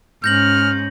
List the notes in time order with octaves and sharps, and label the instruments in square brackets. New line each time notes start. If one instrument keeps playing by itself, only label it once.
[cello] G#2 C#4 [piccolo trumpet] F6 [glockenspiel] G6 A#6 F#7